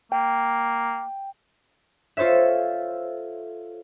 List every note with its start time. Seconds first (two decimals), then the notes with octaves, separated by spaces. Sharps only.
0.12 A#3 G5
2.17 F4 A4 C5 C#5 E5